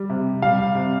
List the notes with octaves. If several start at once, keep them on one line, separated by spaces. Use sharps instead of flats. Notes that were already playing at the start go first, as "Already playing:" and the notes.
Already playing: G3
C3
G3 F5
C3